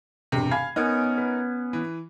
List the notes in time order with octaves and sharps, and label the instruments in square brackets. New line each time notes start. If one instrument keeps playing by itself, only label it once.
[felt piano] E1 G2 [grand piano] C3
[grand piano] F5 [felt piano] G#5 B5 G#6
[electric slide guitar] B3 C#4 [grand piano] D#4 A#4
[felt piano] B4
[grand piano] E3